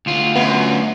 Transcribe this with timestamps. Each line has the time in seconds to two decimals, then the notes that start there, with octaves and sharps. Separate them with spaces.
0.06 D2 F4
0.36 F#2 B3